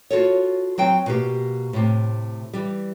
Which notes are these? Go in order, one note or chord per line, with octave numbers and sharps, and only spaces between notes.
F4 F#4 A4 C#5
F#3 C4 G5
B2 A#3 G4
A2 C3
E3 G3